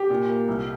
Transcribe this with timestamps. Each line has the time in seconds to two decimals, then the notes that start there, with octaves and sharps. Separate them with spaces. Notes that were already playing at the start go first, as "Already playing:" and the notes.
Already playing: G4
0.10 A#2
0.29 A#3
0.48 C2